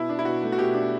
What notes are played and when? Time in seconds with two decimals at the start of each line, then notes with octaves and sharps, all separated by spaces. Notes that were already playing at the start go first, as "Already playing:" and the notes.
Already playing: B2 E4
0.09 D4
0.19 E4
0.25 B2 F#4
0.42 A3
0.52 F#4
0.58 B2 G4
0.74 D4